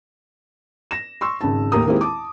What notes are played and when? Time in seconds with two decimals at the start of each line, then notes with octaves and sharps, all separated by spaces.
0.91 A#6 E7
1.21 C6 C#6 E6
1.41 G#1 C#3 A5
1.72 D#2 A2 G4 A#4 A#5 D#6
1.86 D#3 G#3 A#3 C4 E4 G4
2.01 A5 D6